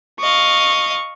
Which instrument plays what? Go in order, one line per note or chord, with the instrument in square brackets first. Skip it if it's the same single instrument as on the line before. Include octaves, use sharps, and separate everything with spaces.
[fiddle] D#5 F5 [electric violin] C#6